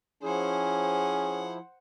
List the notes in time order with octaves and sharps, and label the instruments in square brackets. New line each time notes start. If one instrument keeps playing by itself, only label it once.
[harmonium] F3 E4 [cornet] C#4 [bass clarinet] G#4 [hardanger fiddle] C5 F#5